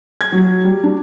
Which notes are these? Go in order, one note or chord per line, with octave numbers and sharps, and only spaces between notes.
G#6
F#3
G3
D4